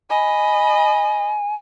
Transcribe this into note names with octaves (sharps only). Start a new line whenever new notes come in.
D#5 G#5 B5